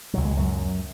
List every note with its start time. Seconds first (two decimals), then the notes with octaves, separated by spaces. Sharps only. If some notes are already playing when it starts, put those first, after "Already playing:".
0.13 C#2 B2 F#3
0.25 G#3
0.37 F#2 F#3